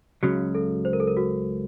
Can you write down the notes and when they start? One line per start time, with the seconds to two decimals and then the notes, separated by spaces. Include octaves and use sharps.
0.23 C#2 C#3 F#3 F#4
0.55 A4
0.85 C5
0.93 A#4
1.00 A4
1.07 A#4
1.17 F#4